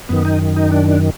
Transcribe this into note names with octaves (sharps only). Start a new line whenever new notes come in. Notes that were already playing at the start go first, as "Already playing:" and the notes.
F#2 D#3 B3
D#4
D#4
D4